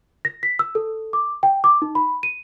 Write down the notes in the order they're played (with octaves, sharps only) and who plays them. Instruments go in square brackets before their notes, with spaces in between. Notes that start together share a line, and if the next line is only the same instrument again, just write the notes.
[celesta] A#6
B6
E6
A4
D6
G5
D6
D#4
B5
D#7